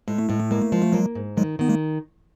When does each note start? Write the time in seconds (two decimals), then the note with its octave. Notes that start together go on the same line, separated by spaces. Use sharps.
0.08 A2 G#3
0.18 A3
0.29 A2 G#3
0.40 A3
0.51 G#3 A#3
0.62 A3
0.72 F3 G#3
0.82 A3
0.92 F#3 G#3 A#3
1.15 G#2
1.37 D#3 F#3 G#3
1.59 D#3 B3
1.69 G#3 A#3